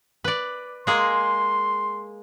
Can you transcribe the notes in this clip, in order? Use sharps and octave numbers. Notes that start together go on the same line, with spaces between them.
B4 D5
G#3 A#3 G#4 C6